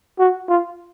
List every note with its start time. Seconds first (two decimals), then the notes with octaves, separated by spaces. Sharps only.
0.19 F#4
0.49 F4